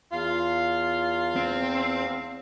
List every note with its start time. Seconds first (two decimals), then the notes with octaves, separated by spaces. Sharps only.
0.12 E2 F4 F5
1.36 C4